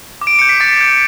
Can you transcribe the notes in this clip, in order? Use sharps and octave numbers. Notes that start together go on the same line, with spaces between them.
D6
D7
G6 C#7
B6
D6 A6
G6